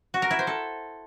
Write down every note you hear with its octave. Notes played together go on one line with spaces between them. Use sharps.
F#4
A#4
E4
C5
A4